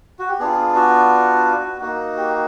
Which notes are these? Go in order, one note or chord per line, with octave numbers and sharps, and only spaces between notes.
F#4
G4
B3 D4 F4 G#4
F#4
A#3 D#4 F#4
G4